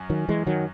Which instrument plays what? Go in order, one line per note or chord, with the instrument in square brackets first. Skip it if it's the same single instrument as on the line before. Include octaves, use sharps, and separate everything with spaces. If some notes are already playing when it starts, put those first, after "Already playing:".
Already playing: [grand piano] F#2
[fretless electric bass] D#3 F#3
E3 G#3
D#3 F#3